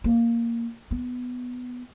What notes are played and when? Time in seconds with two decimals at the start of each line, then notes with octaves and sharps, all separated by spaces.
0.04 A#3
0.91 B3